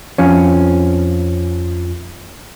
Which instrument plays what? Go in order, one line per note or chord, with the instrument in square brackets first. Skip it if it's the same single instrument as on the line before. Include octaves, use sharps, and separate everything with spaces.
[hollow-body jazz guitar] F2 F3 C#4